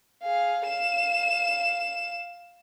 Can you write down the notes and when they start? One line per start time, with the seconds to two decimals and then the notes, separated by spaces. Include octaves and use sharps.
0.23 G#4 F5
0.66 F5 E7